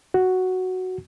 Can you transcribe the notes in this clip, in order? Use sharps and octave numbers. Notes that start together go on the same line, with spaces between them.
F#4